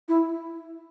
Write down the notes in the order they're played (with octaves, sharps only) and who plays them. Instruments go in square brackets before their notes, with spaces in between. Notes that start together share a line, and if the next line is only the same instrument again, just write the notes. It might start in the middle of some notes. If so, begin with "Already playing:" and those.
[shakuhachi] E4